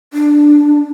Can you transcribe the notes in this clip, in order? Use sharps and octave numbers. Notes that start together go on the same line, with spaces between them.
D4